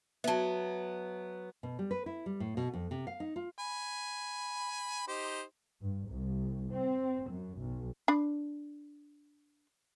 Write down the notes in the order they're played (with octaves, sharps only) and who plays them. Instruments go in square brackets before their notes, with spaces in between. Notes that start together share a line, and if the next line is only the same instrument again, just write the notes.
[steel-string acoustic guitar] F#3 B3 [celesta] E5 A5
[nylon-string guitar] B2
G3
B4
E4
G3
A2
B2
F2
C3
F5
D#4
F4
[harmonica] G#5 B5
D#4 G4 C5
[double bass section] G2
C2
C4
F#2
B1
[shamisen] D4 B5